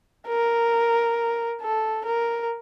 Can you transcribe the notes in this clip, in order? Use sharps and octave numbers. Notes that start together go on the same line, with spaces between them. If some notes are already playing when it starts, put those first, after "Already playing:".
A#4
A4
A#4